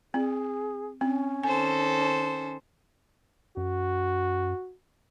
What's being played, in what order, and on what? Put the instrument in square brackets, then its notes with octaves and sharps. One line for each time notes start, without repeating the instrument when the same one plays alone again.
[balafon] C4 [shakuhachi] G#4
[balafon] C4 [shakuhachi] C#4
[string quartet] D#3 A4 C5 [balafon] G#5
[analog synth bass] F#2 [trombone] F#4